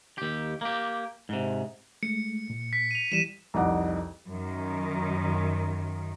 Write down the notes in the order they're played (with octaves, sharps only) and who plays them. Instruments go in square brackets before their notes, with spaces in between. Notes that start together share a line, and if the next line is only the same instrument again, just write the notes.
[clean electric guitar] D#2 G4
A#3 G4
G#2 C3
[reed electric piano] G#3 A3 [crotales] C#7
[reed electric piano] A#2
[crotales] B6
D#7 F7
[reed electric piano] E3 G3 [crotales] D#7 E7
[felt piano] C2 F2 D#4 F#5 D6
[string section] F#2 D#3